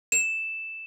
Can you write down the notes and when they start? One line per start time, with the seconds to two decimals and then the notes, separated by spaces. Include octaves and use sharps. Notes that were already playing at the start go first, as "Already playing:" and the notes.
0.12 E7